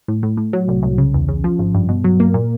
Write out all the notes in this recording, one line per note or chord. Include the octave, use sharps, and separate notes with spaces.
A2
A2
A2
F#3
C2
C2
C#3
E2
C#3
F3
G#1
G2
B2
F#3
A#3
A#2